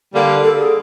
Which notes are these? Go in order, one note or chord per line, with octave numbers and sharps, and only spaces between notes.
D3 G3 A#3
A4
G#4